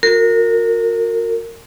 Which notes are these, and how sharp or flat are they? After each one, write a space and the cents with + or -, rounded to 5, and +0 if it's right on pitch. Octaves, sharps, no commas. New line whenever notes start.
F#4 -40 A#4 -20